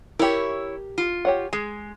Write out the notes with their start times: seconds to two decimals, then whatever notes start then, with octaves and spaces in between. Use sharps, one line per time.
0.19 E4 G4 A#4 C#5
0.98 F4
1.25 G4 C#5 F#5
1.53 G#3 G#4